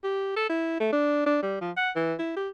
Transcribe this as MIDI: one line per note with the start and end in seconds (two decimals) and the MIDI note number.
0.03 0.36 67
0.36 0.48 69
0.49 0.75 64
0.80 0.89 57
0.92 1.26 62
1.26 1.38 62
1.42 1.59 55
1.61 1.71 53
1.77 1.90 78
1.96 2.14 52
2.19 2.34 64
2.36 2.49 67